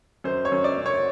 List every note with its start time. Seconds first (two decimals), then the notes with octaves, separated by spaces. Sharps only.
0.24 F#2 C5
0.45 C#5
0.52 F#2
0.64 D5
0.78 F#2
0.86 C#5